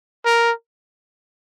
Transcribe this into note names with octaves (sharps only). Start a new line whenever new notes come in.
A#4